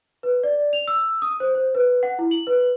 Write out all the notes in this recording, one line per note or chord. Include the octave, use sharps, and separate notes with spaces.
B4
D5
F7
E6
D#6
C5
C5
B4
F#5
E4
F#7
B4